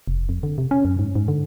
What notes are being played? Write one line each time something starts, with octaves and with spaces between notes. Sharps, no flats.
F1
F2
D3
C3
C#4
F#2
G#2
G#2
D3